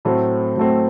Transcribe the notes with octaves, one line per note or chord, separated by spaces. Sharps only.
A2 F#3 A3 C4
A2 F#3 A3 C4